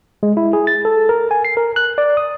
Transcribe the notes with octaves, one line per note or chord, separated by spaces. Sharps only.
G#3
E4
G#4
A6
A4
A#4
G#5
C7
A#4
F#6
D5
D#6